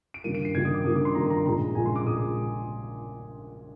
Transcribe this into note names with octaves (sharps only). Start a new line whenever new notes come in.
D7
G2 D#3 G3 A#3 D#7
D7
C7
G2 D#3 G3 A#3 G#6
D#6
D6
G2 D#3 G3 A#3 D#6
D6
C6
G2 D#3 G3 A#3 A#5
A#5
A#1 A#2 G#3 A#5
A#1 A#2 G#3 G#5
C6
D6
A#2 G#3 D#6